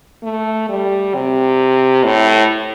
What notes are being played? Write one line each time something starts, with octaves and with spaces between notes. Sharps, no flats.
A3
G3
C3
A2